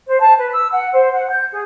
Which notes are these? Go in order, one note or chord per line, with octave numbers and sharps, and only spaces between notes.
C5
A5
B4
E6
F#5
C5
F#5
G6
G#4